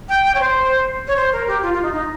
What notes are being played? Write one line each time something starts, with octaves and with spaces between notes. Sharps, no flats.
G5
G5
C#5
C5
C#5
C5
A#4
G4
F4
F4
D#4
D#4